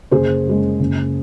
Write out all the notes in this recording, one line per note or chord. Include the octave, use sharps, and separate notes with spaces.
F#1 G#4 C5
F#2 C#3 G#3
F#1